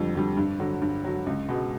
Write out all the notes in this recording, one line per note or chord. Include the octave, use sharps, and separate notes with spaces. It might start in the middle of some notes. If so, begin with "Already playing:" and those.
Already playing: F2 D3 G3
D3 G3
G2
D3 F#3
G2
D3 F#3
C#2
B2 G#3